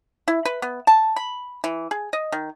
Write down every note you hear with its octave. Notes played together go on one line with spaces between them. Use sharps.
E4
B4
B3
A5
B5
E3
G#4
D#5
D#3